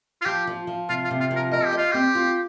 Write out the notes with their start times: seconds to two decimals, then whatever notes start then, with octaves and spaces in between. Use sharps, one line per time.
0.22 F4
0.25 F3 G4
0.47 F3
0.67 F3
0.89 C3 F4
1.04 F4
1.11 C3
1.20 F4
1.31 F3
1.36 A#4
1.51 A#4 D#5
1.65 G4
1.73 F4 D#5
1.92 C4 G4
2.15 F4